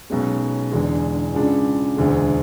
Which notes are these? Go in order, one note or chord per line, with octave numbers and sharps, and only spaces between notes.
B1 B2 G#3 C#4
E1 E2 D3 G#3
C#2 C#3 G#3 D4
E1 D2 D3 G#3